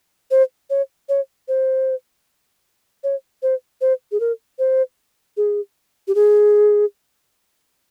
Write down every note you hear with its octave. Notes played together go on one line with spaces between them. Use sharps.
C5
C#5
C#5
C5
C#5
C5
C5
G#4
A#4
C5
G#4
G4
G#4